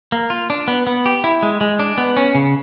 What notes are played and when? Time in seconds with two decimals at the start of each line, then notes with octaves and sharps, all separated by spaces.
0.12 A#3
0.30 F4
0.50 D4
0.68 B3
0.87 B3
1.06 G4
1.24 E4
1.43 G#3
1.61 G#3
1.79 D4
1.98 B3
2.17 C#4
2.35 C#3